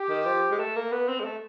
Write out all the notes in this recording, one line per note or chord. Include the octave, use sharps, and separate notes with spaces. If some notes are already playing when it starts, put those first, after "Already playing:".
Already playing: G4
D#3
F3
G#3
A3
A#3
B3
C4
G#3
A3